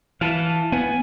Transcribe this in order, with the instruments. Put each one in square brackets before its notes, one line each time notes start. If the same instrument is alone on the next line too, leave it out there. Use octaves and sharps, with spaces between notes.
[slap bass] E3 [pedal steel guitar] F5 A5
[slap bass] B3 [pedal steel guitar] G#5